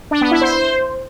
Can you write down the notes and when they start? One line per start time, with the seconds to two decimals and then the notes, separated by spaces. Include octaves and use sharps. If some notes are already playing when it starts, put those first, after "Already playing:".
0.11 D4
0.21 B3
0.31 E4
0.41 C5